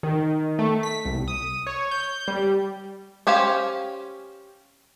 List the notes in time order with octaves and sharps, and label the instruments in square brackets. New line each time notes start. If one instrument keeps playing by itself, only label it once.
[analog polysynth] D#3
A3
B6
C2
D#6
C#5
G6
G3
[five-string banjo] C#4 G4 C5 F5 G#5